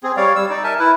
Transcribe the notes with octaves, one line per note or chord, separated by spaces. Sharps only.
C4 G#4
G3 C#5 D5 F5
G3 E6
D#4 D5
A#4 E5 G#5 A5
E4 B4